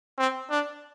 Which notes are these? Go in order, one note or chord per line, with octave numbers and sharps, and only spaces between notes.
C4
D4